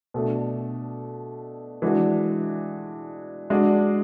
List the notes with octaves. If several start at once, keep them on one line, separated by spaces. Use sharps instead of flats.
B2 A3 D4
E3 G#3 D4 F#4
G#3 D4 F#4